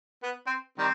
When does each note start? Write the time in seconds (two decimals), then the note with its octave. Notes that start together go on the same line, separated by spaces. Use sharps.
0.23 B3
0.47 C4
0.78 D#3 G3 C4